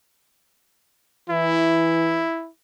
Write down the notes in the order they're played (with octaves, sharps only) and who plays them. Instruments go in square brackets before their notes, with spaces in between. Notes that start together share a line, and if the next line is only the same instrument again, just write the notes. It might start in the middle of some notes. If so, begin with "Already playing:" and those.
[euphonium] E3 [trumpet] E4